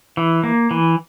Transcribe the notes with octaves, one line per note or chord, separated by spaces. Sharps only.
E3
A#3
E3